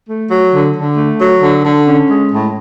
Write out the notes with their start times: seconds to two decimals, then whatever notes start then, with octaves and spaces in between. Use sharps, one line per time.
0.07 A3
0.29 F#3
0.51 D3
0.74 D3
0.96 A3
1.18 F#3
1.41 D3
1.64 D3
1.86 C#4
2.09 G#3
2.31 A2